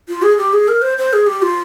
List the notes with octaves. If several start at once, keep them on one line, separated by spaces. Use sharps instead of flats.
F4
G#4
G4
G#4
A#4
C5
C5
G#4
G4
F4